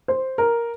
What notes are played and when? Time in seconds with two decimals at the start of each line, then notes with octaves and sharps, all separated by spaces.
0.08 C5
0.38 A#4